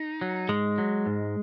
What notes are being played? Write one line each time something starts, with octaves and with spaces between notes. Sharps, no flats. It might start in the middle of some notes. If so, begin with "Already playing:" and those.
Already playing: D#4
F#3
G#2 G#3
F#3
G#2